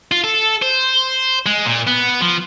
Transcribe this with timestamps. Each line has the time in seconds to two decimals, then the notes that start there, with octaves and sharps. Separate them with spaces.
0.12 F4
0.24 A4
0.62 C5
1.46 G#3
1.65 A#2
1.87 B3
2.21 F3